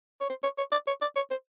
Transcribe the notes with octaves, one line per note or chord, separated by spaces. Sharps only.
C#5
C5
C#5
C#5
D5
C#5
D5
C#5
C5